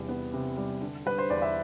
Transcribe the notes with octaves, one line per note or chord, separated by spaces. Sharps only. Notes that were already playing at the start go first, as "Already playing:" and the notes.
Already playing: E2 C3 G3
B3
C3
G3
D3
G3 B4
C5
E2 D5
E5